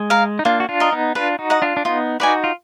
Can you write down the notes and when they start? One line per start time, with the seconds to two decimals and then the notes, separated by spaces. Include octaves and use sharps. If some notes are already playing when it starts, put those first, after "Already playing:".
Already playing: G#3
0.10 A#4 F5
0.39 D#4
0.45 A#3 D4 F4
0.60 F#4
0.69 D4 F4
0.80 A#4 D#5
0.92 B3 D#4
1.15 D4 F4 B4
1.39 D#4 F#4
1.50 D#5 F#5 A#5
1.62 D4 F4
1.77 D4
1.85 B3 D#4 F4
2.20 D#4 F#4 B4 D5 G#5
2.44 F4